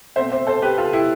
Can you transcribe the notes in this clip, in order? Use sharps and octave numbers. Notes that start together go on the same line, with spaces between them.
B2 A3 C4 C5 E5
C5 E5
A4 C5
G4 B4
F4 A4
E4 G4